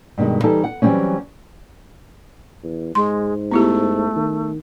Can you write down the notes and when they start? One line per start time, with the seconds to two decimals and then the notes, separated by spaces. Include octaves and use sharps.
0.18 G2 B2 D#3 G#3
0.43 E3 G3 D#4 A4 A5
0.64 F#5
0.82 E3 F#3 G3 A#3 C4 C#4
2.64 E2
2.95 G#2 G#3 C6
3.51 A3 B3 E4 G4
4.16 D#3